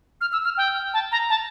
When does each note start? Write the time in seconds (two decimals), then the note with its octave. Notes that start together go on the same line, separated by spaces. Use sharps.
0.21 F6
0.33 E6
0.45 F6
0.58 G5
0.94 A5
1.12 A#5
1.30 A5